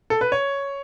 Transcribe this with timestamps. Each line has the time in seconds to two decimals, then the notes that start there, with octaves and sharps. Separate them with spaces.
0.10 A4
0.21 B4
0.32 C#5